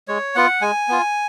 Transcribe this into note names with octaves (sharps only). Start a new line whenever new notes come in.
G#3 C#5
B3 F4 F#5
G#3 G#5
B3 F4